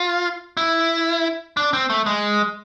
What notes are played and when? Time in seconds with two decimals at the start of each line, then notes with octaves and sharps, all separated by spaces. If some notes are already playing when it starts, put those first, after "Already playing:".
Already playing: F4
0.57 E4
1.57 D4
1.73 C4
1.90 A3
2.06 G#3